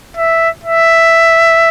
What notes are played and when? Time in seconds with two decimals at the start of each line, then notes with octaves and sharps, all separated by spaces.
0.17 E5
0.63 E5